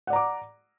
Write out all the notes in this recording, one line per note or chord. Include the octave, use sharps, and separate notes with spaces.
D5 F#5 A#5 D6